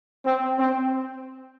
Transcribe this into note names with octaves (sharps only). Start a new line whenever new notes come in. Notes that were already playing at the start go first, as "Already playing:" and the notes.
C4
C4